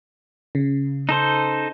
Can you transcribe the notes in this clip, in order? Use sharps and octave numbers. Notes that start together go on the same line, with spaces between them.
C#3
D#4 A4 C5